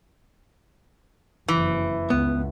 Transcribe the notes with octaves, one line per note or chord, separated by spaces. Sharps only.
F#1 F2 E3
C#2 B3